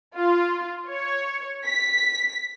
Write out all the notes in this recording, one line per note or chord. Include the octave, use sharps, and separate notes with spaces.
F4
C#5
B6